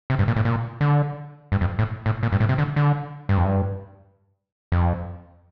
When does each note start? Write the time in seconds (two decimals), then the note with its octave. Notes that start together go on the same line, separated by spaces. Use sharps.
0.10 C3
0.19 G2
0.28 A#2
0.36 A2
0.45 A#2
0.81 D3
1.52 G2
1.61 F2
1.79 A2
2.06 A2
2.23 A#2
2.32 G2
2.40 A2
2.49 C3
2.58 D3
2.76 D3
3.29 G2
3.37 F2
3.45 G2
4.72 F2